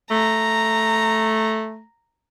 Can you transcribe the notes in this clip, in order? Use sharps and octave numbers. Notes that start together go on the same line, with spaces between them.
A3 A#5